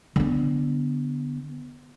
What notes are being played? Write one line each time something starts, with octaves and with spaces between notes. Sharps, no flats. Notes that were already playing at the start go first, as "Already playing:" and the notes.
D3 B3